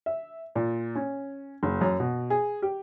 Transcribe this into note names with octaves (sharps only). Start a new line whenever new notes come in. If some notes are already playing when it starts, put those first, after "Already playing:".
E5
A#2
C#4
F#1
F#2
B2
G#4
G4